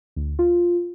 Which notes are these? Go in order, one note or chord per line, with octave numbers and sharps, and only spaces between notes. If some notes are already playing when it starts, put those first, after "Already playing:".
D2
F4